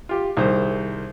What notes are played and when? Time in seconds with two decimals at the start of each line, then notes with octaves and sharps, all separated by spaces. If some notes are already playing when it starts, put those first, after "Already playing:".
0.09 F4 G4
0.37 C2 D#3 G#4 C5